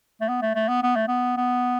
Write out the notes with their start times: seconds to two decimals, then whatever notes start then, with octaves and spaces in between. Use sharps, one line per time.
0.21 A3
0.29 B3
0.42 A3
0.55 A3
0.69 B3
0.83 B3
0.96 A3
1.08 B3
1.37 B3